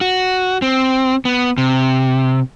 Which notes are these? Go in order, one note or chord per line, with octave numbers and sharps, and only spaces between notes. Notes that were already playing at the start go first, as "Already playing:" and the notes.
F#4
C4
B3
C3